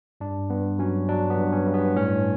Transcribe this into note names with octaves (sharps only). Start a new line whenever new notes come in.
G2 D4
G2 B3
F#3 C#4
F#3 D4
B3
G2
C#4
G2
B3
A2 C#4